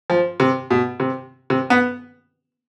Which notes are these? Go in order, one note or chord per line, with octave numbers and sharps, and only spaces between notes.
F3
C3
B2
C3
C3
B3